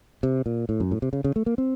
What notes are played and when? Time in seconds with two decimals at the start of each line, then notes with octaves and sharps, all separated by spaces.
0.23 C3
0.46 A#2
0.69 A2
0.80 F#2
0.91 A2
1.02 C3
1.13 C#3
1.24 C#3
1.36 A3
1.46 A#3
1.58 C4